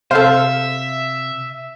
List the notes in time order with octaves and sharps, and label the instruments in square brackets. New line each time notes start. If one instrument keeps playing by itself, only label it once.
[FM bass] C3 [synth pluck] A4 C5 [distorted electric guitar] E5 [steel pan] F5